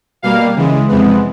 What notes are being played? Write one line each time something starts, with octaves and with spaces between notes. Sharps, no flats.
B2 G3 A#3 F5
C#3 E3 G#3
F2 C3 E3 G#3 B3